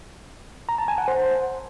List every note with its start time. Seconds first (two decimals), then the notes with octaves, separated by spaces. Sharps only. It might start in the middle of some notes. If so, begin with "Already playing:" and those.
0.69 A#5
0.78 A5
0.88 G#5
0.98 F#5
1.08 C5